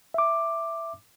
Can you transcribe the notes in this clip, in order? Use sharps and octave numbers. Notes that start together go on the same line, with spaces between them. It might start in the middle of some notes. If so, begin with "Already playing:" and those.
E5 D6